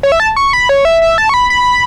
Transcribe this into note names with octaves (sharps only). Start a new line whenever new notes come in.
C#5
E5
A5
C#6
B5
C#5
E5
E5
A5
C#6
B5
B5